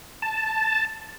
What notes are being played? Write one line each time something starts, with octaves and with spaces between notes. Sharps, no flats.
A5